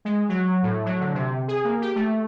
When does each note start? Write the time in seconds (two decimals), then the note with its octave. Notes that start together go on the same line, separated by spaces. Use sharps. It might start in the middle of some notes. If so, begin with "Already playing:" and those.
0.05 G#3
0.29 F#3
0.63 A2
0.85 F#3
1.00 D3
1.14 C3
1.48 G#4
1.64 A#3
1.81 G4
1.96 A3